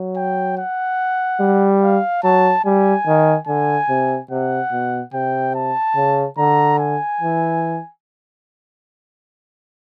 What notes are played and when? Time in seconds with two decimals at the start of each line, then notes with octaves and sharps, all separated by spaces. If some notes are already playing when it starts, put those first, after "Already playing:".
Already playing: F#3
0.16 G5
0.58 F#5
1.40 G3
1.82 F5
2.23 F#3 A5
2.65 G3 G#5
3.07 D#3
3.47 D3 G#5
3.89 C3
4.31 C3 F#5
4.72 B2
5.13 C3 G5
5.55 A5
5.96 C#3
6.38 D3 A#5
6.79 G#5
7.21 E3